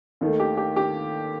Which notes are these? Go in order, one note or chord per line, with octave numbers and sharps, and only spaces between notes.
D#2 D#3 A3
G4
G4
G4